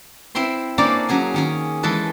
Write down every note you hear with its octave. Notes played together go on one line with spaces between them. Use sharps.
C4 E4 E5 G5 C6
A#3 C#4 D4 A4 C5 D5
F#3 C#4 G#4 G#5
D#3 C#4 G#4
E3 G#3 A4 B4